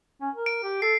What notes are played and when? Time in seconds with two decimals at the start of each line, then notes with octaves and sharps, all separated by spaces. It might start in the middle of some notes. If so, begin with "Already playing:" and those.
0.21 C#4
0.35 A#4
0.46 D7
0.63 G4
0.82 A4 C7